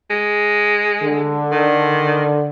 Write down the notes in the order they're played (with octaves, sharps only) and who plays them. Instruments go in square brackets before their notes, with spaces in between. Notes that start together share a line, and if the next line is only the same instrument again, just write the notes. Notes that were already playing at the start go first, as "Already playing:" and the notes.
[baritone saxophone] G#3
[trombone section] D3
[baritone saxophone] D#3